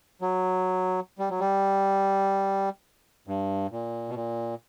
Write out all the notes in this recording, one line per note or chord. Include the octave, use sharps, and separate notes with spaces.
F#3
G3
F#3
G3
G2
A#2
B2
A#2